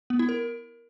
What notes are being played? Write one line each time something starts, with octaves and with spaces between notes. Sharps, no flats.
B3
E4
A#4